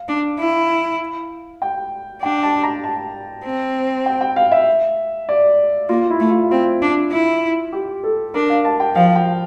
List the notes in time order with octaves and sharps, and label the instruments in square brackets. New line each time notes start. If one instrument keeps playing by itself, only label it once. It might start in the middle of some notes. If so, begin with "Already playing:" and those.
Already playing: [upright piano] F5
[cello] D4
E4
[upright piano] G5
[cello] D4 [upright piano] G5
[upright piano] A5
A#5
A5
[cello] C4
[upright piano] G5
G5
F5
E5
D5
[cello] A#3 [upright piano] F4
[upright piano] E4
[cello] A3
[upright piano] F4
[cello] C4 [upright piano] F4
[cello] D4
E4
[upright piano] G4
A4
[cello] D4 [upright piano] A#4
[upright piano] F5
A5
G5
[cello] F3 [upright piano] F5
[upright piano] G5